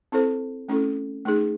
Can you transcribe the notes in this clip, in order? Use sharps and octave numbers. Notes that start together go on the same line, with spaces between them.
C4 E4 A4 C5
A3 C#4 E4 A4
A3 D#4 G#4